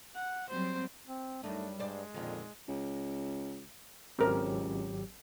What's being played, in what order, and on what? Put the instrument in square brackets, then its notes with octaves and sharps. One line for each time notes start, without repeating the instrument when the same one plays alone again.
[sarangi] F#5
[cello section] F#3 G3 C4 [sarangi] C5
[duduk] C4
[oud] F#2 D#4 [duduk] G3 [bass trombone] A3 [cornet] D4
[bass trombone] G2 [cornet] G#3 [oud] C5 D5
[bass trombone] F2 [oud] A#2 D3 D#3 [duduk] F4
[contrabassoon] C#2
[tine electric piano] G#1 F#3 G4 [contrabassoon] C#2 [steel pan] C4 A4 A#4